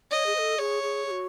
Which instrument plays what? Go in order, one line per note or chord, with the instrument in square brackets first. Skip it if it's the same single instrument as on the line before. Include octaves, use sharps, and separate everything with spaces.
[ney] C#5 [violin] D#5
[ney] G#4
C5
A4
[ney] G#4 [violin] C#5
[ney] G#4
G#4
F#4